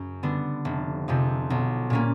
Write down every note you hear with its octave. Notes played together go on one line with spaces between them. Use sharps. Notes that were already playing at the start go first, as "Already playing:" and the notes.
Already playing: F#2 C#3
D3 G3 B3 D4
F1
F2 C3 F3 G#3
B1
A#2 G3 A#3 C#4